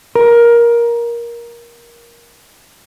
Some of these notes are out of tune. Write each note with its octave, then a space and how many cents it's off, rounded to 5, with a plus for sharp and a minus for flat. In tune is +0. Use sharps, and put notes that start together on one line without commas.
A#4 +15